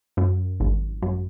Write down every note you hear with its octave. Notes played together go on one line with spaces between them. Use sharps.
F#2
G#1
F#2